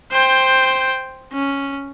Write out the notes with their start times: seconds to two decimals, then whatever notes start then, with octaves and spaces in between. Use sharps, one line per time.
0.11 C5 G5
1.33 C#4